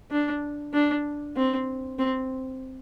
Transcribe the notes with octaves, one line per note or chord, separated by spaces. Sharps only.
D4
D4
C4
C4